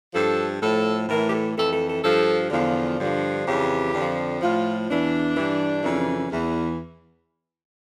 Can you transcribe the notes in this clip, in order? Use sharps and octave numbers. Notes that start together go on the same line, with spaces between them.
G2 F3 A4
A2 F3 A4
A2 E3 A#4
G4
A4
F2 E3 A4
A4
A4
G2 F3 A4
E2 D3 F3 F4
G2 D3 F3
F2 C#3 E3 G4
F2 D3 F3
A2 F3 F4
E2 E3 D4
G2 E3
F2 C#3 E3
E2 E3